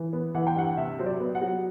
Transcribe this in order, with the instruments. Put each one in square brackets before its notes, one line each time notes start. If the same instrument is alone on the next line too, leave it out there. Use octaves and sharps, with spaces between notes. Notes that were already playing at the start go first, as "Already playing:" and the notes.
Already playing: [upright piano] E3
B3
E3 F#5
G5
G2 F#5
C3 E5
F#3 C5
D5
B3
F#5
F#3